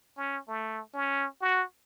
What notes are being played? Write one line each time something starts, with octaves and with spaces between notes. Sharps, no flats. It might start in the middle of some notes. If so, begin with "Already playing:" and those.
C#4
A3
C#4
F#4